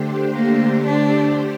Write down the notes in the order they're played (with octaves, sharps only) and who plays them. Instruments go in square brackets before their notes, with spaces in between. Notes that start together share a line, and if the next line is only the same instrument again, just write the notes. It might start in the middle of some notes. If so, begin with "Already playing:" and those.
Already playing: [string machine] D3 A3 D4 G4 C5
[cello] A#3
D4